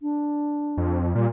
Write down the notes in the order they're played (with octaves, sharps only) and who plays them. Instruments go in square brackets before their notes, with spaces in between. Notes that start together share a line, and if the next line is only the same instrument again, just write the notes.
[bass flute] D4
[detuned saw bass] F2
[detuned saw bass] A#2 [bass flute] G3